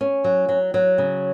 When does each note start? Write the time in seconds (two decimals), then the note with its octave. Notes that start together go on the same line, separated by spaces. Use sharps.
0.01 C#4
0.24 F#3
0.49 F#3
0.74 F#3
0.98 C#3